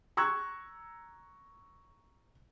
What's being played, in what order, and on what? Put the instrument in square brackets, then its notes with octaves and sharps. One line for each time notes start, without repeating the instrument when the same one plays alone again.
[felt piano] A#5 C#6 E6 F#6 G#6